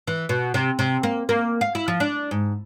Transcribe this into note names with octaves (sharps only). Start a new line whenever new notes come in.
E3
B2
C3
C3
A#3
A#3
F5
E4
F3
D4
G#2